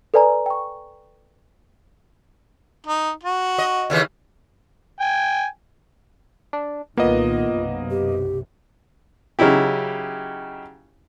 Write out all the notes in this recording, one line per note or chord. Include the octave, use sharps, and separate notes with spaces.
A4 B4 D5 G#5 A#5
G5 C#6
D#4
F#4
D#5
D#2 C#3 E3
G5 G#5
D4
C2 A#2 D#3 A#3 B3 F4 D#5
B1 F#2 C3
G4
C#3 F#3 D#4 E4 G4